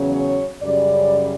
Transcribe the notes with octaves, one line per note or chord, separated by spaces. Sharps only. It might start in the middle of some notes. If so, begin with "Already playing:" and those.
Already playing: E2 C#3 F#3 C#4
C#5
F#2 C#3 G3 D5